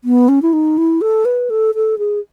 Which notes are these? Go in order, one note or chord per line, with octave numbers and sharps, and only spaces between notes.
B3
C#4
E4
D#4
E4
A4
B4
A4
A4
G#4